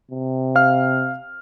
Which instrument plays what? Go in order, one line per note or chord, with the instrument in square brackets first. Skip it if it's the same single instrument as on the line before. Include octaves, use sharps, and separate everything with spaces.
[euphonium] C3
[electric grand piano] F5 F6